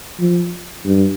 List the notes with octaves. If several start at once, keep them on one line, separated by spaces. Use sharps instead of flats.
F3
G2